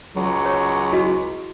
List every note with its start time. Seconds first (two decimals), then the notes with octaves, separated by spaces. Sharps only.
0.16 C#2 F#3
0.46 C#5
0.93 E4 F#4 D#5